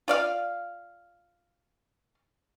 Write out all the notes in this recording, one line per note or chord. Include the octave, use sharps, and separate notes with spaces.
F4 D5 F5